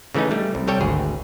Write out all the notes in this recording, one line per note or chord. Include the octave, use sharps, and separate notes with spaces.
C#3 E3 A3 C#4 D#4
G3 A3
C2
C3 G3 A4 C#5 G5
G#1 D2 G#4